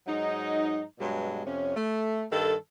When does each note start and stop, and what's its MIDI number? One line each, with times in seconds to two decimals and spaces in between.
0.07 0.83 44
0.07 0.83 54
0.07 0.83 63
0.99 1.43 43
0.99 1.43 47
0.99 1.43 54
0.99 1.43 56
1.45 1.75 41
1.45 1.75 48
1.45 1.75 61
1.75 2.23 57
2.31 2.54 43
2.31 2.54 51
2.31 2.54 69